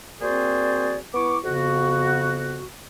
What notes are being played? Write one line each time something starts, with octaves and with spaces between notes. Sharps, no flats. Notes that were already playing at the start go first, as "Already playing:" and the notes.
A#3 C4 F#4 G#4 C5 D5
B3 E4 C#6 D6
F2 C#3 B3 F#4